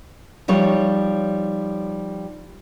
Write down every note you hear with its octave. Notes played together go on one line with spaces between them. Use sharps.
F3 G3 D#4 C#5